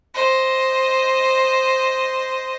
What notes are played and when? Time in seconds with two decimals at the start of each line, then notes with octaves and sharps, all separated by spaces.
0.14 C5 D#5